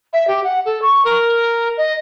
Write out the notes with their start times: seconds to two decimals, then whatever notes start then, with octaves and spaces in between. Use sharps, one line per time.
0.13 E5
0.28 G4
0.44 F#5
0.65 A4
0.82 C#6
1.05 A#4
1.77 D#5